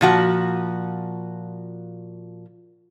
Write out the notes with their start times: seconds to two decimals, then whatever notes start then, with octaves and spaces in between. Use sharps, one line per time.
0.01 A#2 F3 F#4